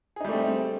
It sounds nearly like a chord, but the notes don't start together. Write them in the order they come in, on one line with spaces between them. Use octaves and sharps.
G#4 D#4 G3 A3 C4